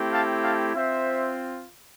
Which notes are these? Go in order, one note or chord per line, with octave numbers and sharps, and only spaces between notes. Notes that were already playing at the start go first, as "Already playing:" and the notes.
Already playing: A3 C4 E4 G4
F5 A5
F5 A5
C4 F4 C5 E5